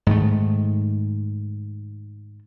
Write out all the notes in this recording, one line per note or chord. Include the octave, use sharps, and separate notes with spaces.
G#2 D#3 A3